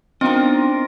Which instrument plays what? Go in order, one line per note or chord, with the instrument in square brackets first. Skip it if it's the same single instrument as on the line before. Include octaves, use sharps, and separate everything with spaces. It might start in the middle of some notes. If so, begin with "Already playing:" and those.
[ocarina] B3 [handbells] C4 [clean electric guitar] D4 D#4 D#5 [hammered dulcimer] F4 A#4